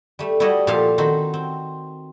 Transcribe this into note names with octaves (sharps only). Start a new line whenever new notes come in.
G3 A3
G3 E4 F#4 A4 D5 D#5
A#2 F3 G4 A4 F5 C6
D#3 C4 F#4 B5
C4